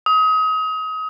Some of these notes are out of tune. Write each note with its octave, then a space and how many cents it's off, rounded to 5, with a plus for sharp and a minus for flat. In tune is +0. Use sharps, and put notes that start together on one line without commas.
D#6 +30